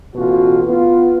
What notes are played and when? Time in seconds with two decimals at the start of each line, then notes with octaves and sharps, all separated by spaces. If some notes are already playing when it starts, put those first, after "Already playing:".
0.16 A1 B2 F4 F#4
0.68 B3 F4